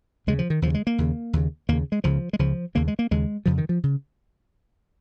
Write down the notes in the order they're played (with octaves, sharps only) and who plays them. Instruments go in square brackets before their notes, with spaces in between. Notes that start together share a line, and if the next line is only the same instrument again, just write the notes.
[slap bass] D#2 C#3 G#3
F3
D#3
D#2 C#3 F3
G#3
A#3
D#2 C#3
D#2 C#3
D#2 A#3
C#3
G#3
C#2 C#3 F3
G#3
C#2 C#3 F3
D#2 C#3 A#3
G#3
A#3
D#2 C#3 G#3
F2 C#3 F3
D#3
F3
C#3